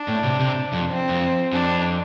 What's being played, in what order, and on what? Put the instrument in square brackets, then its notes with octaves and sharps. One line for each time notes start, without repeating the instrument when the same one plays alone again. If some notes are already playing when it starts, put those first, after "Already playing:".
Already playing: [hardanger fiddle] D4
[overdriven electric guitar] A2
C3
C3
F2
[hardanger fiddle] C4
[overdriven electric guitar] F2
[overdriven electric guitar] F2 [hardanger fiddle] D4